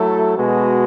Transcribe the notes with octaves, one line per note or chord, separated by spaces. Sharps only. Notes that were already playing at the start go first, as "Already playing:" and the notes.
Already playing: F#3 A3 E4 A4
B2 G#3 B3 F#4